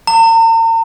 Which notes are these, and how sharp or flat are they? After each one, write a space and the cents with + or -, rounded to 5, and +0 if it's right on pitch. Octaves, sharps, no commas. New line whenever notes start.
A#5 -45